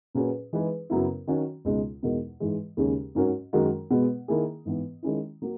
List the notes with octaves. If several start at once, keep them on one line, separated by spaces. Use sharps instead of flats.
A#2 F#3 C#4 G#4 B4
E3 G#3 D#4 G#4 B4
F#2 C#3 F#3 B3 E4
D#3 F#3 C#4 F#4
C#2 B2 G#3 D#4
E2 B2 G#3 D#4 A#4
G#2 E3 G#3
D#2 C#3 G#3 C#4 G#4
G#2 F#3 C#4 F#4 A#4
F#2 D#3 G#3 D#4 F#4
B2 G#3 B3
D#3 A#3 E4 G#4
G#2 E3 B3
D#3 G#3 C#4 E4
F#3 A#3